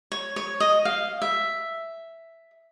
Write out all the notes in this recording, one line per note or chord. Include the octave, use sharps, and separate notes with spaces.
C#5
C#5
D#5
F5
E5